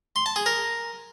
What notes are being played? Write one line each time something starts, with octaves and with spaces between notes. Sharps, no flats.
C6
A5
G#4
A#4